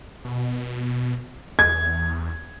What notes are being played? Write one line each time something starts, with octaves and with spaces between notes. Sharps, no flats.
B2
E2 G#6